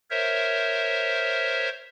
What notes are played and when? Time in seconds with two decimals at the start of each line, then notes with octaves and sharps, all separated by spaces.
0.10 A#4 C5 C#5 E5